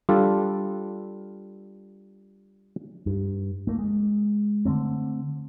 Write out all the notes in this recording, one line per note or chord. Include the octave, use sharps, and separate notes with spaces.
G3 D4 F4 A4
G2
A3 A#3
G#3
D3 D#3 A3 C4